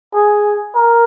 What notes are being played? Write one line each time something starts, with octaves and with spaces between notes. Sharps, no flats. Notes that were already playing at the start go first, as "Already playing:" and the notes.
G#4
A#4